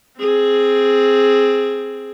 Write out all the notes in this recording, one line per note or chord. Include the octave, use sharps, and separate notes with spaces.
C4 G#4